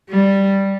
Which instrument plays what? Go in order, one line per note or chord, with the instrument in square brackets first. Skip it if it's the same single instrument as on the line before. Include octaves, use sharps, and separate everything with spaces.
[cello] G3